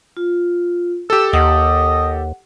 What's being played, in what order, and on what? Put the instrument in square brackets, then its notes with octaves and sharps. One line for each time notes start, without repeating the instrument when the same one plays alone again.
[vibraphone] F4
[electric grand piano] G4 A4 [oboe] E6
[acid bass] D#2 [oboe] D#5 [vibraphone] F#5